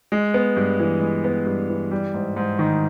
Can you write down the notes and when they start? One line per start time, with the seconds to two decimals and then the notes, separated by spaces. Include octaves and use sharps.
0.12 G#3
0.34 B3
0.57 G2
0.79 E3
1.01 G#3
1.24 B3
1.46 G2
1.70 E3
1.91 G3
2.14 G#2
2.37 G#2
2.59 D#3